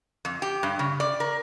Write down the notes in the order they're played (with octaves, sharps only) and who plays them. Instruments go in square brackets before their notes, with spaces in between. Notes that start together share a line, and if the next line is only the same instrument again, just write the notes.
[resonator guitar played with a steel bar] F2
G4
G2
C#3
D5
A#4